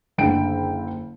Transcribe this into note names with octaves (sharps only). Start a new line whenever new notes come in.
F#1 D3 G5 D7